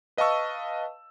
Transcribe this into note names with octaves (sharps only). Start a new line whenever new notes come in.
B4 D#5 F5 A5 C#6 E6